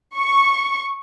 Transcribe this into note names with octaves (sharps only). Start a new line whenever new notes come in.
C#6